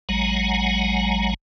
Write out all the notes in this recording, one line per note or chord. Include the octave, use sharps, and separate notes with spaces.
A1 F#3 G#3 F#5 G#5 A#5